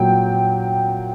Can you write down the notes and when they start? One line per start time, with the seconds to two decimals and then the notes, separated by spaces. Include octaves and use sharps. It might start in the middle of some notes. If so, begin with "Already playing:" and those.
Already playing: A#2 F#3 G5